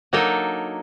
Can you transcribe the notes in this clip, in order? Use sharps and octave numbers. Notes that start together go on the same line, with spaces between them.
F#3 A#3 D4 D#4 A4 A#4